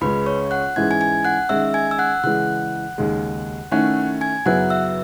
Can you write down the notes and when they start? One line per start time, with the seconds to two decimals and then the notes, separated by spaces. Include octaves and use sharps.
0.01 C#2 C#3 G#3 C#4 B4 B5
0.26 C#5 C#6
0.51 F#5 F#6
0.76 G#2 E3 G#3 C#4 E4 G#6
0.91 G#5 G#6
1.01 G#5 G#6
1.25 F#5 F#6
1.49 D#3 G#3 C#4 E5 E6
1.74 G#5 G#6
1.91 E6
1.99 F#5 F#6
2.23 C#3 E3 G#3 F#5 F#6
2.98 D#2 C#3 G#3
3.71 D#3 A3 C#4 E4 F#5 F#6
4.21 G#5 G#6
4.46 F#2 C#3 F#3 B3 E4 F#5 F#6
4.70 E5 E6